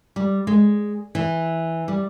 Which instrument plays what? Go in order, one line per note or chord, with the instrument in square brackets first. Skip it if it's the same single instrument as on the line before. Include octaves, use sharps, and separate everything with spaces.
[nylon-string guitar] G3
G#3
E3
G3